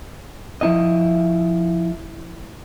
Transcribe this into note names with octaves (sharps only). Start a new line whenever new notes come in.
F3 E4 D#5